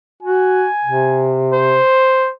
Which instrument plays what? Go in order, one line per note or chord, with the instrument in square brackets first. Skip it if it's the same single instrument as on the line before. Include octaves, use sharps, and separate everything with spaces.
[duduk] F#4 [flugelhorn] G#5
[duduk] C3
[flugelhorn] C5